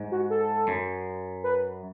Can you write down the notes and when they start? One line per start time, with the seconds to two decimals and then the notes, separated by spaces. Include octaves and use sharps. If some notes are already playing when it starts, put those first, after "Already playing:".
Already playing: G#2
0.12 F#4
0.30 A4
0.68 F#2
1.44 B4